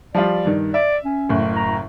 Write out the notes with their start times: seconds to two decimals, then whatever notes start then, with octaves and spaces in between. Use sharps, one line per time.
0.15 F3 G3 F4 D5
0.45 G2 D#3
0.74 D5 E5
1.05 C#4
1.29 F#1 A2
1.56 A#5